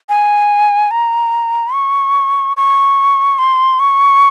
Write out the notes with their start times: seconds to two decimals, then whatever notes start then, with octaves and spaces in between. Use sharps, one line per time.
0.09 G#5
0.91 A#5
1.74 C#6
2.57 C#6
3.39 C6
3.80 C#6